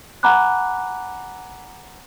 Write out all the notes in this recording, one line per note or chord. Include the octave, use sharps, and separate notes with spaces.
F#5 G#5 A#5 B5 D6 F#6